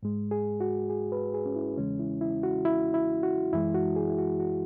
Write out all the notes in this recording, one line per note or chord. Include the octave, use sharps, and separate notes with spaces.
G#2 G#3
G#4
F#4
G#4
B4
G#4
C#4
E4
E2 C#3 E3 G#3 C#4
E4
E4
F#4
E4
E4
F#4
F#2 E3 G#3 E4
F#4
G#4
E4
F#4
F#4